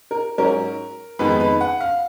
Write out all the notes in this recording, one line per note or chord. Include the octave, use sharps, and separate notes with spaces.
A#4
G#2 F#3 C#4 A#4
F2 D#3 G#3 B3 D#4 B4
B4
F#5
F5